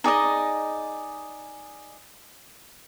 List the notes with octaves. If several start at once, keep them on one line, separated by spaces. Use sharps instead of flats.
D#4 G#4 D5 D#5